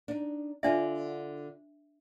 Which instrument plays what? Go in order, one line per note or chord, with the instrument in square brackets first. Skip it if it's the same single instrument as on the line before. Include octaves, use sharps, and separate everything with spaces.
[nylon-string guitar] D4 D#4
[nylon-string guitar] D3 F4 D5 [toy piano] D4 E5